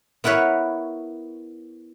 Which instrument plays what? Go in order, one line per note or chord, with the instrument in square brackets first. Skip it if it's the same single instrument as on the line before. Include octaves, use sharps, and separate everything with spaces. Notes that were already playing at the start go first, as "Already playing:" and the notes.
[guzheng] B3 E4 A#4 B4 C#5